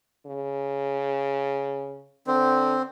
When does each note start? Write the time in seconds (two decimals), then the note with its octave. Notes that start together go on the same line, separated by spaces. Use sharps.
0.26 C#3
2.27 D3 C4